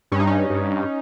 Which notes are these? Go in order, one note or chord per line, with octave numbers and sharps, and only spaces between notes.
G2 C#4
D#4
C#4
G2